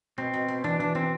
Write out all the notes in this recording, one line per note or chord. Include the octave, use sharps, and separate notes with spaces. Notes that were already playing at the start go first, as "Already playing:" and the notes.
B2 C4
B2
B2
E3 D4
E3 D4
E3 C4